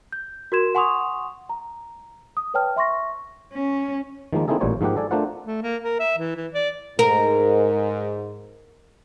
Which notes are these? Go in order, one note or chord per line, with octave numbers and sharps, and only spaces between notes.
G6
F#4 A#4 C6 G#6 E7
F#5 G#5 C6 C#6 D#6 F7
A#5
D#6
B4 C#5 G5 A5 F6
E5 C6 C#6 A#6
C#4
D#3 F3 G#3 A#3
A#3 C4 D#4 E4 G#4 A4
A1 A#2 G3 C5 C#5
G#2 F3 A#3 G4 F#5
A4 D5 G#5
A3 D4 F4 A#4 C5 F#5
A3
A#3
A#4
E5
E3
E3
D5
G#2 A#4